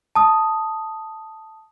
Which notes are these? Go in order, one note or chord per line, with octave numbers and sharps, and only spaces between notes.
A5 D#6